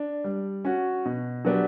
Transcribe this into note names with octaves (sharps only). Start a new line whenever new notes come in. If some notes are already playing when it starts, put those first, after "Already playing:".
Already playing: D4
G3
C#4 F#4
B2
F#3 B3 D4 G4